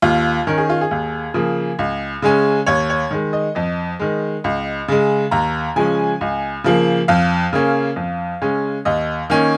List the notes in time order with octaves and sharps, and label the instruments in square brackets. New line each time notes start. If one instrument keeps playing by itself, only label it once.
[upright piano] D#2 F4
D#3 C#4 A#4
G#4
F4
G#4
D#2
C#3 F3 A#3
C#2
C#3 G#3 C#4
D#2 C#5
C#5
D#3 G#3
D#5
F2 D#5
D#3 G#3
C#2
C#3 G#3
D#2 A#5
C#3 F3 G#3 C#4 G#5
C#2
C#3 F3 A#3
F2 F5
C#3 A#3 C#4
F2
C#3 G#3 C#4
D#2 D#5
D#3 A#3 C#4